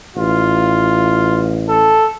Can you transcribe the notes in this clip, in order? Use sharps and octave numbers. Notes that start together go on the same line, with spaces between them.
A1 F4
A4